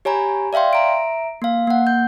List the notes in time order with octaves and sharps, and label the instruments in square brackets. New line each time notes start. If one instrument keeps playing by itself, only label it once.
[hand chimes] G4 C#5 G#5 A#5 B5
D5 E5 F5 G5 C6
E5 A#5 D7
A#3 F5
A#3 F#5
G6